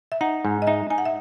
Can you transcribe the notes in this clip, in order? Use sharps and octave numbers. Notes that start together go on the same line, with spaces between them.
E5
D#4 F#5
G#2
D#5
D#4 E5
D#4 G#5
F#5
E5